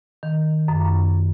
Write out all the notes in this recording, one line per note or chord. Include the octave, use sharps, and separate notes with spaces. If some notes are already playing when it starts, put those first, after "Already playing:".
D#3
F#2
F#2